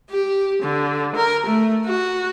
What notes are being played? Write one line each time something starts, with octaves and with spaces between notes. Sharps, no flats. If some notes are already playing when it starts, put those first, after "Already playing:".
G4
D3
A#4
A3
F#4